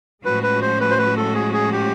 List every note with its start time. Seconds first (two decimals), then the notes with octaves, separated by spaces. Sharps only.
0.25 A2 F3 G#3 C#4 F#4 B4
0.43 B4
0.62 C5
0.81 B4
0.90 C5
0.98 B4
1.17 A4
1.35 G#4
1.53 G#4
1.72 G4